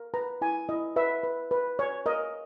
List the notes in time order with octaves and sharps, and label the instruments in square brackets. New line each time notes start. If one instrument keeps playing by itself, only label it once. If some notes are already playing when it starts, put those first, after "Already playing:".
Already playing: [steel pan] A#4
B4 A#5
E4 G#5
E4 D#5
B4 E5
B4
B4
C#5
A#4 D#5